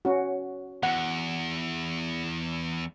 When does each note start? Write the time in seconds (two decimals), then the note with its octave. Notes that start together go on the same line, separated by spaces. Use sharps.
0.05 C#4 F#4
0.83 E2 F#5